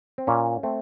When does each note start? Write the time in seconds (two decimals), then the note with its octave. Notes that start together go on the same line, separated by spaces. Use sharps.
0.18 C4
0.27 A#2 C#4
0.63 A3 C4